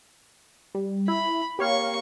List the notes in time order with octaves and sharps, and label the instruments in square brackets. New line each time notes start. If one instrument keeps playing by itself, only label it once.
[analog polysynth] G3
[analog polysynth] E4 [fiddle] B5
[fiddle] A#3 C#6 [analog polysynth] G4 C#5 F5